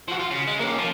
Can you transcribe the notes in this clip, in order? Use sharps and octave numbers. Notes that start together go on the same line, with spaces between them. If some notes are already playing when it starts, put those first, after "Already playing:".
F3 F#4
F4
C#3
G#3
A#3 C#4
F3